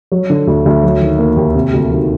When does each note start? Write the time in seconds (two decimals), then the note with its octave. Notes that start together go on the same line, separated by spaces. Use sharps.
0.12 F#3
0.30 D3
0.47 D2
0.66 D2
0.83 F#3
1.01 D#3
1.19 A#3
1.37 D#2
1.55 C3
1.73 D2
1.91 D#3